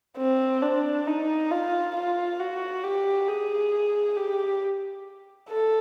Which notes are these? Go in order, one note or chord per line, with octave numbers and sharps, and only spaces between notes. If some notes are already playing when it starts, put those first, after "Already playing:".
C4
D4
D#4
F4
F4
F#4
G4
G#4
G4
A4